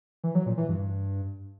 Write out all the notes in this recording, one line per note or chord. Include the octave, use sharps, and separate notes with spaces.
E3
F#3
A#2
E3
G2